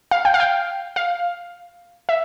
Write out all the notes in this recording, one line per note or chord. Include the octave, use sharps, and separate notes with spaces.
F5
G5
F5
G5
F5
E5